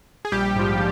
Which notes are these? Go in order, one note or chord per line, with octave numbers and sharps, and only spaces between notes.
G#4
A#1 G3 G4
G#2 F3